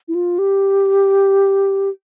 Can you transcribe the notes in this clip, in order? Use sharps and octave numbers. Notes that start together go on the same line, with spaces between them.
E4
F4
G4